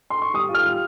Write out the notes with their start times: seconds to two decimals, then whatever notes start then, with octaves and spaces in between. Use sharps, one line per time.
0.10 C6
0.22 C#6
0.34 G3 D#6
0.49 F4
0.54 F6
0.65 G3